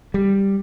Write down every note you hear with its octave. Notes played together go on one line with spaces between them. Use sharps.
G3